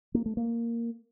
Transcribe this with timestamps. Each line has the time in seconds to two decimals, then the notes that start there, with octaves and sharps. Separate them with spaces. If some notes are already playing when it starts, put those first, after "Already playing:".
0.14 A#3
0.26 A3
0.37 A#3